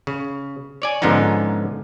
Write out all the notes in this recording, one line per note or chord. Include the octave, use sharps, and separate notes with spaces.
C#3
C#5 D5 G#5
G#2 D3 F3 B3 C#4 D#4